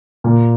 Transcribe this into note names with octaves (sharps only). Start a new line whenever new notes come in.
A#2